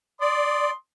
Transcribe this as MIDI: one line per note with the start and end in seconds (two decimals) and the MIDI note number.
0.21 0.71 74
0.21 0.73 84
0.21 0.73 87